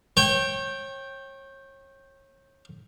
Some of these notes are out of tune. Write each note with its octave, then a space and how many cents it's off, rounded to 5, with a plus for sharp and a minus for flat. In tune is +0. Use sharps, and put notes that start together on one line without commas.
C#5 -30 G5 +0